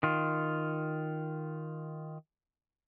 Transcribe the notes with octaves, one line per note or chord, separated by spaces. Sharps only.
D#3 F4